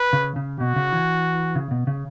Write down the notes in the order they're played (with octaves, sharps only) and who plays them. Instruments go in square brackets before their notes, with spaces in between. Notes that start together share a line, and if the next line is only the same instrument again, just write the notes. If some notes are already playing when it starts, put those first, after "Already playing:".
Already playing: [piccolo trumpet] B4
[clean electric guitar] C#3
C#3
[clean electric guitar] B2 [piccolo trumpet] F#4
[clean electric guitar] C#3
E3
C#3
B2
C#3